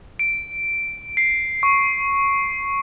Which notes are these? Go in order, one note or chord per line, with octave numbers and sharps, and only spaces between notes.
D7
C7
C#6